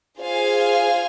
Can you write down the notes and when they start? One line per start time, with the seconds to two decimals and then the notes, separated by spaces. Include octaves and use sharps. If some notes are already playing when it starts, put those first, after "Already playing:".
0.19 F4 G#4 C5 F5 G#5